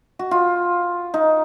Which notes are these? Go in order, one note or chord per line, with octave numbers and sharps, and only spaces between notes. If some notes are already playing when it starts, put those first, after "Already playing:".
F#4
F4
D#4